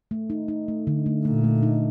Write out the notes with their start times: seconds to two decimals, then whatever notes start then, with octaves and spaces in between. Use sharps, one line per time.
0.11 A3
0.30 D#4
0.48 D#4
0.68 A3
0.87 D3
1.06 A3
1.25 A#2 A3
1.44 A3
1.63 D#4